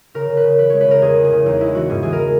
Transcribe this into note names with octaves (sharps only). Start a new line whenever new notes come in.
C#3 A#4
C#3
B4
C#3
E3 B4
G#3 C#5
B4
C#3 A#4
E2 G#4
C#3
G#4
C#3
E2 D#4
G#3 E4
E3 F#4
G#2 G#4
E3 G#4
A#4